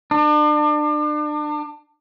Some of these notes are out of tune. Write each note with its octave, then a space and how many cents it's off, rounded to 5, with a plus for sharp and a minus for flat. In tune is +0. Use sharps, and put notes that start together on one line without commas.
D4 +35